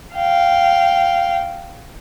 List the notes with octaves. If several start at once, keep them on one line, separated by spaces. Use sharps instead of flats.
F5 G5